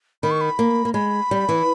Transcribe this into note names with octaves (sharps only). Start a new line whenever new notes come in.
D#3 B5
C#6
B5
A#3
A#3
G#3 B5
G3
E3